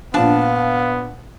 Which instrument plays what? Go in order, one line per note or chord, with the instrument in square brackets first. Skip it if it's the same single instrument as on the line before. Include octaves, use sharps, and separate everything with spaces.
[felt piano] A#2 F3 [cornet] B3 [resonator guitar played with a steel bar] D4 A5 [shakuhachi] F5